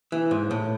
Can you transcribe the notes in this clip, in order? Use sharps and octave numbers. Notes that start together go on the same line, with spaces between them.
E3
G#2
A2